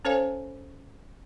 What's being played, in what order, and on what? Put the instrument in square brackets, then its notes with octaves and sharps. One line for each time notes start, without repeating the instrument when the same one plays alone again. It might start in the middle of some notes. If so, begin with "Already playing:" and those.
[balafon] C#4 A4 C5 C#5 F5 G#5